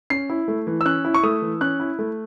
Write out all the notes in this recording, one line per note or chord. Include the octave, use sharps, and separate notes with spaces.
C#4 C7
E4
A3
E3
E6
C#4 F#6
E4
C#6
A3 D#6
E3
C#4 F#6
E4
A3